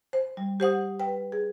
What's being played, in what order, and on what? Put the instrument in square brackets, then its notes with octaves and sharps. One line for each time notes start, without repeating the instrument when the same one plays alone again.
[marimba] C5
G3
G4 C5 F#5 D#6
B4 G5
G#4